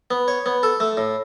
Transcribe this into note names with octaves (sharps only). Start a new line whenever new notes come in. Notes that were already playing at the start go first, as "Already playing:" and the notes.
B3
C#5
B3
A4
A3
A2